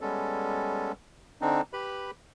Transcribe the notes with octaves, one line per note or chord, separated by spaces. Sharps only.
G3 G#3 B3 C#4 A4
D3 C4 D4 D#4
G4 B4 B5